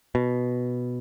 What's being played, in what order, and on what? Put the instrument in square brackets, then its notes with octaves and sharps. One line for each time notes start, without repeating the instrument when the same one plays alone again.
[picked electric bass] B2